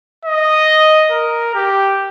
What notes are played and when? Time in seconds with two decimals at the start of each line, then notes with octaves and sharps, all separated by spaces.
0.25 D#5
1.11 A#4
1.55 G4